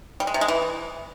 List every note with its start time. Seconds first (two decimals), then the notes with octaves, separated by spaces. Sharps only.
0.20 G3
0.27 G#3
0.34 C3
0.41 G#3
0.48 E3